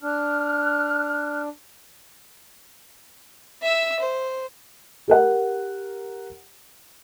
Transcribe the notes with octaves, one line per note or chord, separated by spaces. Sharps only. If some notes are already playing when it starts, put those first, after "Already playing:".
D4 F6 F#6
E5 E6
C5
G4 A#4 F#5